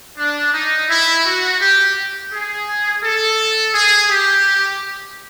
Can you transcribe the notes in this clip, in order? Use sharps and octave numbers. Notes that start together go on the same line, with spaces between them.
D4
D#4
E4
F#4
G4
G#4
A4
G#4
G4